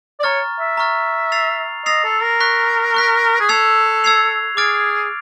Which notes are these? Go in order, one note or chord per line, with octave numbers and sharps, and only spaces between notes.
D5
C#5 A#5 C#6 F6 A6
E5
A#5 C#6 F6 A6
E6 A6 C7 F7
D#5 E6 A6 C7 F7
A4
A#4
C#6 F#6 B6
C#6 F#6 B6
G#4
A4 E6 G#6 C7 F7
E6 G#6 C7 F7
G#4 D6 F6 A6 D7